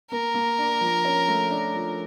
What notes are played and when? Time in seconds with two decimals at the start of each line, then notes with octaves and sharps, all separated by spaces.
0.11 A#3 A#4
0.34 A#3
0.58 D4
0.81 F3
1.05 C#4
1.28 A3
1.51 D4
1.75 F3